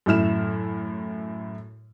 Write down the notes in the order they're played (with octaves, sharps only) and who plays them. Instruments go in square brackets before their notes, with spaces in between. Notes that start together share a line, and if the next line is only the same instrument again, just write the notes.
[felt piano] F#2 A2 E4 F6 E7